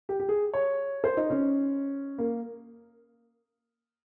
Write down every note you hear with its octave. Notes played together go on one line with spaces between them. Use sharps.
G4
G4
G#4
C#5
C5
D#4
C#4
A#3